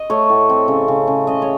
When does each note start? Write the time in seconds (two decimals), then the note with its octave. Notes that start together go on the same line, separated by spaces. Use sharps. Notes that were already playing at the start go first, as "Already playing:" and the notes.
Already playing: D#5
0.10 A3 C#5
0.30 A2
0.49 C4
0.68 C#3
0.88 C#3
1.07 C#3
1.27 C#3 D#5
1.42 C#5